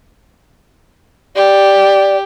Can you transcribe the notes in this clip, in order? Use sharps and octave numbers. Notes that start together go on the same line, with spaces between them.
G4 D5